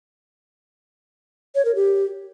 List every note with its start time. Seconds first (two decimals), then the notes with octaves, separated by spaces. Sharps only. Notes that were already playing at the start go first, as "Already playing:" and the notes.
1.55 C#5
1.65 A#4
1.75 G4